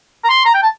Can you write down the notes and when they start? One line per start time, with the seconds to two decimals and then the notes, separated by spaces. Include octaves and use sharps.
0.24 A#5
0.30 C6
0.46 A#5
0.54 G5
0.63 A5